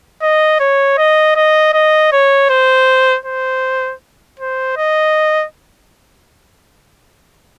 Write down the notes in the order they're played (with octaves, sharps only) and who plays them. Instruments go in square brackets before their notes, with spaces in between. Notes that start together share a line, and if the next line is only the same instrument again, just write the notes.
[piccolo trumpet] D#5
C#5
D#5
D#5
D#5
C#5
C5
C5
C5
D#5